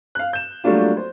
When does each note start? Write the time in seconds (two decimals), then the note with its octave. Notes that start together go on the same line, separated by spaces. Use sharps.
0.15 F5 F#6
0.33 G6 E7
0.64 F#3 G3 A3 A#3 D4 F4
0.97 C5